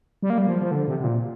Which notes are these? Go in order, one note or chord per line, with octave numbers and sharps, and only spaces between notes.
G3
A#3
G3
F3
F3
D3
C3
C3
A#2